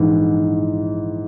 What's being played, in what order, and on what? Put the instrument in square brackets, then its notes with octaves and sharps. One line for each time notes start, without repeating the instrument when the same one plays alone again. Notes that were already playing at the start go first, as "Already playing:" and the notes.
Already playing: [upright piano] A#1 G#2 E3